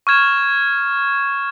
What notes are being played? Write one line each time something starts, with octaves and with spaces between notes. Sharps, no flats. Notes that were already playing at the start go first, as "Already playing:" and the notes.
C#6 F6 G#6 E7